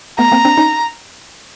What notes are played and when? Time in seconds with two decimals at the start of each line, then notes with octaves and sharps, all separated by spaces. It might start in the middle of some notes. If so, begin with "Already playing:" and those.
0.19 A3 B3 A#5
0.32 A#3 C4
0.45 C4 D4
0.57 C#4 D#4